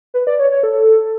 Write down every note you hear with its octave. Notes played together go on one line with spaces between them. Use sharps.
B4
D5
C#5
C#5
A4